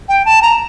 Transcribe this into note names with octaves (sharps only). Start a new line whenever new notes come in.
G5
A5
A#5